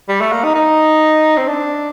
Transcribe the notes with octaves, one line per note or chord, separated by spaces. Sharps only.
G3
A3
A#3
D#4
D#4
C4
D4